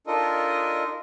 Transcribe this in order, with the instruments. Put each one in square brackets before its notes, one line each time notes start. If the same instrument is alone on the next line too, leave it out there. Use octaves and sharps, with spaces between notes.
[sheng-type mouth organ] D4 D#4 F4 A4 A#4 D#5